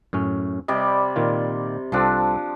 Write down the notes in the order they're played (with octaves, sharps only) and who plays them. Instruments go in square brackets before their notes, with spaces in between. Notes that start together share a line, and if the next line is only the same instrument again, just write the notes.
[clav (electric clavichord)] F#2 A2 C#4
[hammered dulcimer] C3 G3 D5 [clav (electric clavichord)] D#5
[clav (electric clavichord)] A#2 D#3 F4
[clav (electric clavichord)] C2 C4 A4 [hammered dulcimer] F3 D4